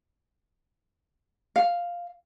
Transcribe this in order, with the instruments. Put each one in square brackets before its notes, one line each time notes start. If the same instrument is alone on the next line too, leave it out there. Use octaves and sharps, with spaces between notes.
[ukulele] F5